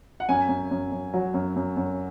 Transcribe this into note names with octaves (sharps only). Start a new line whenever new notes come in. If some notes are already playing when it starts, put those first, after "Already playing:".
F#5
F#2 G#5
F#2
F#2
F#2
F#3
F#2
F#2
F#2